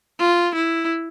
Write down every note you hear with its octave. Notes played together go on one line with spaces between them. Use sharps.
F4
E4